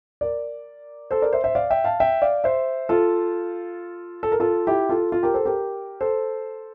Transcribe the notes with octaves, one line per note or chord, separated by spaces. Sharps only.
A#4 D5
A4 C5
A#4 D5
C5 E5
C5 E5
D5 F5
E5 G5
F5 A5
E5 G5
D5 F5
C5 E5
F4 A4
A4
A#4
F4 A4
E4 G4
F4 A4
F4
G4 A#4
A4 C5
G4 A#4
A4 C5